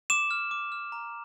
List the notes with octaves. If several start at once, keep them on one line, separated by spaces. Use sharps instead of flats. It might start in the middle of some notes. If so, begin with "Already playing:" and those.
D6 E7
F6
D6
F6
A#5